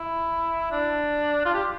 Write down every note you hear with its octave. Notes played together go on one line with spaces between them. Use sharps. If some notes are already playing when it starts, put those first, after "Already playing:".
Already playing: E4
D4
F4
G4